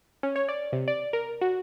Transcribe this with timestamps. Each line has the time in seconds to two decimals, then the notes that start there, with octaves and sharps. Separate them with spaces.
0.23 C#4
0.36 C#5
0.49 D5
0.73 C3
0.88 D5
1.13 A#4
1.41 F#4